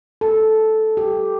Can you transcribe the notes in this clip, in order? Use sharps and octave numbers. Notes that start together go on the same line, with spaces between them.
A4
G4